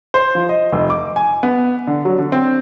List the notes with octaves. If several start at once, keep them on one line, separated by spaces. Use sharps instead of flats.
C5
F3
D#5
F1
D6
G#5
B3
D3
F#3
D3
C4